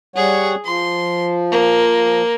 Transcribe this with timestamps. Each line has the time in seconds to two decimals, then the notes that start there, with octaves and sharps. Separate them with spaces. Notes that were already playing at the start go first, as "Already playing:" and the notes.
0.16 G3 G#4 C#5 F#5
0.65 F3 C6
1.51 A#3